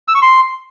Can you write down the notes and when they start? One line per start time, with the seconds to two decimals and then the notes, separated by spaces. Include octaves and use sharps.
0.08 E6
0.15 C#6
0.22 C6